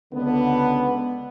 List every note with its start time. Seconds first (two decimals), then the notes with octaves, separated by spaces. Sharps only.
0.13 C#2 D3 B3